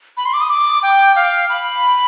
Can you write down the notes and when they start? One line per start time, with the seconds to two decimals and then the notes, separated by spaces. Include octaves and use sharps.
0.17 B5
0.25 C6
0.34 D6
0.41 D#6
0.50 D6
0.83 G5
1.16 F5
1.49 B5